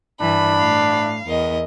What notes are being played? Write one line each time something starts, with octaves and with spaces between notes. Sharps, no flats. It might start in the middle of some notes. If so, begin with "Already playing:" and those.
G2 E3 D4 B5
A2 F5
E2 A#4 D#5